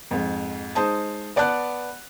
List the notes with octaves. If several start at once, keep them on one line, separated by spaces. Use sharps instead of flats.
F2 G#2
G#3 D#4 C5 A5 D#6
B3 D5 F#5 A5 F#6